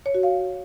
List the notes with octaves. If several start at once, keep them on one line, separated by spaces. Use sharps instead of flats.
C#5
F#4
F5